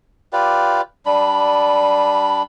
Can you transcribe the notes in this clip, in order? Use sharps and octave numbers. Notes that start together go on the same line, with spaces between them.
F4 G4 B4 D5
G3 D4 B5